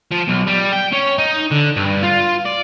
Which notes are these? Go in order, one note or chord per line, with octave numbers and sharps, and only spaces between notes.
F3
B1
G3
G5
C#4
D#4
D3
G2
F4
D5